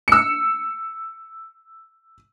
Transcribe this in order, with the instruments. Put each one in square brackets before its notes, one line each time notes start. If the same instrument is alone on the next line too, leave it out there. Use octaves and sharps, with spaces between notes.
[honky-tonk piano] E6 C#7